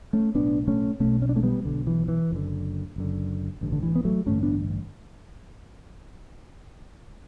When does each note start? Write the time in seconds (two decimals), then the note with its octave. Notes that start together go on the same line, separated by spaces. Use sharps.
0.13 A3 C#4
0.35 B1 A2 B3 D4
0.68 A3 C#4
1.00 B1 B2 A3 C#4
1.22 C#4
1.29 D4
1.36 A3 C#4
1.43 G3 B3
1.65 B1 B2 D3
1.87 E3
2.08 E3
2.30 F#1 F#2 D3
2.96 F#1 F#2 D3
3.61 A1 G2 D3
3.72 D3
3.83 E3
3.95 B3
4.05 F#3 A3
4.26 A1 G2 D3 A3 C#4
4.43 B3 D4